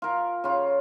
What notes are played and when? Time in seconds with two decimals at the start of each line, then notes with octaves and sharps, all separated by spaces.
0.02 F4 A#4
0.44 C#3 F4